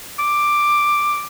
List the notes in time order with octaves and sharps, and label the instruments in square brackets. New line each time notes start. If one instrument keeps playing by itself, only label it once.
[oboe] D6